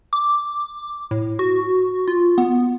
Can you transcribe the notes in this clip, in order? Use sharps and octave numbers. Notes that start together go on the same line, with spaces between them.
D6
A2
F#4
F4
B3